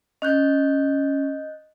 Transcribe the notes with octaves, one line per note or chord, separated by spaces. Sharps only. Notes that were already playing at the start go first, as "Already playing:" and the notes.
C#4 D#5 F#6 G6